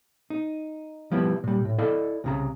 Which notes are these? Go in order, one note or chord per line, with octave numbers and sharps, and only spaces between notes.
D#4
F3 G3 B3 E4
A#2 G3
A2
E4 A4 D5 D#5 F5
C2 C#3 A#5